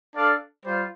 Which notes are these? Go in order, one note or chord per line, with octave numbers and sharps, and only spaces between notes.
D4 A4 D5 F5
G3 F4 C5